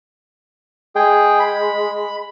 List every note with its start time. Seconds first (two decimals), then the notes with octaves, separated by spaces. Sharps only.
0.96 G#3 G#4 G5
1.40 B5